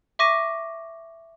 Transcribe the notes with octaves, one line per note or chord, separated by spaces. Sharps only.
E5 C#6 D6 A#6 D#7